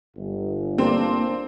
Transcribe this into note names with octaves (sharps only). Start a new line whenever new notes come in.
G1
A#3 C4 D4